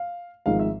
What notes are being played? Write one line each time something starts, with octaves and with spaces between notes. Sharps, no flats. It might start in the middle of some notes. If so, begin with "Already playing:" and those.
Already playing: F5
G#1 G#2 F3 G#3 F5
E5